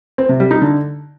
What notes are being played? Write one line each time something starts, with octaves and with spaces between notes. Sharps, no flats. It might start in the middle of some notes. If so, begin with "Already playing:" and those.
C4
C3
G3
D#4
D3